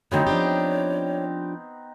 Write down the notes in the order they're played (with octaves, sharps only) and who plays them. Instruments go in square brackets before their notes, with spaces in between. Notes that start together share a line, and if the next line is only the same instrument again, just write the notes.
[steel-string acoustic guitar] D3 F#3 A3 [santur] B3 C4 D#4 [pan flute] C#5
[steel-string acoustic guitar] F3 D4 G4